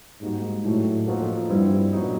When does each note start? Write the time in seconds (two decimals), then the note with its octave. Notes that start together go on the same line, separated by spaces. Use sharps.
0.21 G#2 G3 A#3 D#4 F#4
0.65 A2 F#3 A3 D4 G4
1.06 F3 A#3 D#4 F#4 A4
1.49 G2 G3 C4 E4
1.93 A#2 F#3 B3 D#4